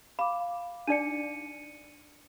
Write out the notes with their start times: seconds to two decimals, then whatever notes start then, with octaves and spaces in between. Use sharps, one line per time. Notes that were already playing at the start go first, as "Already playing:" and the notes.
0.19 F5 B5 D6
0.88 D4 D#4 D5 C#7 D#7